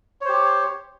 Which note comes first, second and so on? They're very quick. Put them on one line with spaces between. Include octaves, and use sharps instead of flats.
C#5 C5 G4